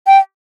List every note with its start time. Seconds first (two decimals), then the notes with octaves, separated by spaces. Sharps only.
0.07 G5